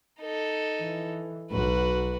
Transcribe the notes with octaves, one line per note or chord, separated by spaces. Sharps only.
D#4 A4
E3
B1 F#4 B4